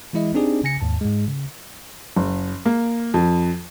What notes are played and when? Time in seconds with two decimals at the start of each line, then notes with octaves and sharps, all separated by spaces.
0.13 E3 G#3 E4 D#5 E5
0.34 C4 D4 D#4 G4 G#4 D5
0.64 C#3 G#5 A#6 C#7
0.81 D#2 G#2 A5
1.01 G#2 G#3
1.28 C#3
2.16 F#1
2.66 A#3
3.14 F2